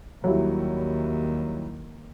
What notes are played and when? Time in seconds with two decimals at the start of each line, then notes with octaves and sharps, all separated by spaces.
0.24 D#2 F#3 G3 E4